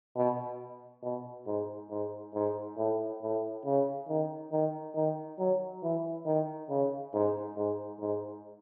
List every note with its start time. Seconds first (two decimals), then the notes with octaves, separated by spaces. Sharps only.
0.16 B2
1.03 B2
1.46 G#2
1.90 G#2
2.34 G#2
2.77 A2
3.21 A2
3.65 C#3
4.08 D#3
4.52 D#3
4.95 D#3
5.39 F#3
5.83 E3
6.26 D#3
6.69 C#3
7.13 G#2
7.57 G#2
8.00 G#2